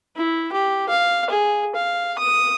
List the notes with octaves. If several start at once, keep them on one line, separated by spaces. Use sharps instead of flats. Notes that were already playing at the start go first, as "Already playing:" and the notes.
E4
G4
F5
G#4
F5
D#6